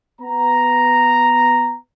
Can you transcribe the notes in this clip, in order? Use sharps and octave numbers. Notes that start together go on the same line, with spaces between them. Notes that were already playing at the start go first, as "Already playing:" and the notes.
B3 A#5